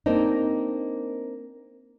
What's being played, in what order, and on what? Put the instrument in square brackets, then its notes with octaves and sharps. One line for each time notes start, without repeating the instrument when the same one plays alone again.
[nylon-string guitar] A#3 C4 D4 D#4